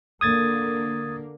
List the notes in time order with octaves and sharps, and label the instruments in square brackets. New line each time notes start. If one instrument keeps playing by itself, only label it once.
[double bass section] D3 A#3 [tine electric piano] D#6 G#6 A6